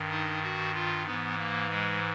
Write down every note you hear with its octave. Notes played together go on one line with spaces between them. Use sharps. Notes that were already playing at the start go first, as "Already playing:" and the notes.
Already playing: G2 D#3
D#4
F#4
F4
G#2 E3 B3
A#3
G#3